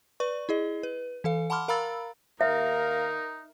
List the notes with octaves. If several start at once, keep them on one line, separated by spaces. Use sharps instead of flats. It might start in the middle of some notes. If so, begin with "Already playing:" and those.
B4 D5 C#6
E4 G#4 D#5
B4
E3 A4 F5
F#5 A5 B5 C6 D6 F6
A#4 F5 A#5 B5 E6 A6
D#2 D#4 A#4 E5 F5